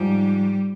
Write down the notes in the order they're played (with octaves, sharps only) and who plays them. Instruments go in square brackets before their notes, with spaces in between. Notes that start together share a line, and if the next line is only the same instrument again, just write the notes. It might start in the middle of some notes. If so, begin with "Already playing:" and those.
Already playing: [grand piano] G#2 F3 G#3 [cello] G3